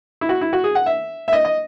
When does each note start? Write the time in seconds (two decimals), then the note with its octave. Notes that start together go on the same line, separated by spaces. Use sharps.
0.21 E4
0.29 F#4
0.41 E4
0.53 F#4
0.64 G#4
0.75 F#5
0.86 E5
1.28 E5
1.33 D#5
1.45 D#5